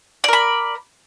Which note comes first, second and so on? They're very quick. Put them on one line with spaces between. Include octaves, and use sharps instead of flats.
D5 A#4 B5